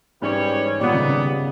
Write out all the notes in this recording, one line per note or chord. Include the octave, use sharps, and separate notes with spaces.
G#2 E3 G3 C#4 G4 C#5
A#2 D#3 G3 B3
C#3
C#3